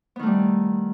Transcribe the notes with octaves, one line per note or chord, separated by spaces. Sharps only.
D#3 G3 A3 B3